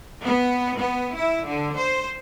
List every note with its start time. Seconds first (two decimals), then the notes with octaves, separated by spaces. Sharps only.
0.23 B3
0.78 B3
1.16 E4
1.47 D3
1.76 C5